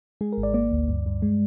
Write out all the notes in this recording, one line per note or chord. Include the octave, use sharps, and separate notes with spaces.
G#3 G#4
A#4
G#1
D5
A#3 D5
D2
G2
G2
G#3